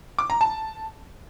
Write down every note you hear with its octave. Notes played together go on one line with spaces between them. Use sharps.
D6
A#5
A5